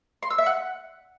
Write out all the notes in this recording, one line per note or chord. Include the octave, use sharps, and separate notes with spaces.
C6
E6
E5
F#5